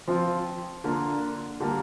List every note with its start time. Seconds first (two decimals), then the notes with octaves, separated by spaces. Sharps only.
0.08 F3 C4 F4
0.84 D3 A#3 D4 F4
1.60 D3 G3 A#3